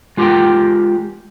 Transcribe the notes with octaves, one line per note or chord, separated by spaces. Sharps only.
G#3 F4 G4 A#4 F#5 G5